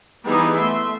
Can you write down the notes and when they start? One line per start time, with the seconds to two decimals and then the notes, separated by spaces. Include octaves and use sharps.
0.24 E3 G3 B3 D#4 G#4
0.55 A3 E5 C6